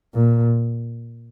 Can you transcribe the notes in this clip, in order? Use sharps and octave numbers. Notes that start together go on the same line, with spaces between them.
A#2